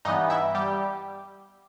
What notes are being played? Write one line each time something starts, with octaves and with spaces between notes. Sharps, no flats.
G2 E3 B3 D#4 D#5
E4 E5
G3 G4